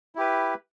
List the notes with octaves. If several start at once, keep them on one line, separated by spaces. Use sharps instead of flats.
E4 G4 B4